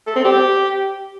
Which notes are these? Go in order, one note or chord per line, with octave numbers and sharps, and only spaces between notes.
A4
C4
G4